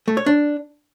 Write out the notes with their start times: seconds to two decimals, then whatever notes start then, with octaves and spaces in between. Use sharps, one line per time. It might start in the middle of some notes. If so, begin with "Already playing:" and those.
0.08 A3
0.17 C#5
0.26 D4